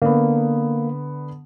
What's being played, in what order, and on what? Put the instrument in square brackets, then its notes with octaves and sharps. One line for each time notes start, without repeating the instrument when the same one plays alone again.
[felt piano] D3 B3 [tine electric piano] A#3